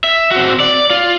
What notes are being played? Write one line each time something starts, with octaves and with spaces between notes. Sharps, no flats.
E5
C4 F#4
D5
F4